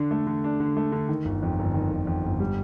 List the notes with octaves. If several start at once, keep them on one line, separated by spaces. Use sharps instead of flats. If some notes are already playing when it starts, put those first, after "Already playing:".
Already playing: D3 D4
A3
D3
D4
D3
A3
D3
D#3
G1
F2
G1
D#3
G1
F2
G1
G3